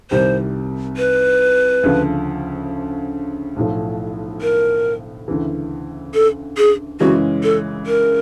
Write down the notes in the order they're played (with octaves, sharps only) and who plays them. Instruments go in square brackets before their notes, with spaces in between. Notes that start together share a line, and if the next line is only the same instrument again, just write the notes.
[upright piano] C2 C3 D#3 G3 [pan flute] C5
[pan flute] B4
[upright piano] D2 C#3 F3
B1 A2 F3
[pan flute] A#4
[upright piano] D2 C#3 E3
[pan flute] A4
G#4
[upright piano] F#2 C#3 E3 G#3 C#4 [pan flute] F#4
[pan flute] A4
A#4